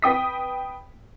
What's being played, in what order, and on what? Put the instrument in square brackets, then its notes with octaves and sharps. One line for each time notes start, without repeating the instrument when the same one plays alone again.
[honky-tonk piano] B4 G5 D#6 B6